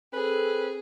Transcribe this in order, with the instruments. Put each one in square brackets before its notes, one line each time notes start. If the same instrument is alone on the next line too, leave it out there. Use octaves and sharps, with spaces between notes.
[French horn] C4 [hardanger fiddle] G#4 [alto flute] A4 [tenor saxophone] B4